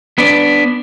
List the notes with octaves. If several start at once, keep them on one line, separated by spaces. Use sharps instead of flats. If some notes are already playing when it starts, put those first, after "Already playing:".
B3 D4